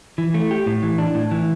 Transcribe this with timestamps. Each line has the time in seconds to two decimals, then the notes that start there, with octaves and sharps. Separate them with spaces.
0.18 E3
0.34 A3
0.51 G4
0.66 A2
0.83 E3
0.98 D4
1.15 A2
1.31 E3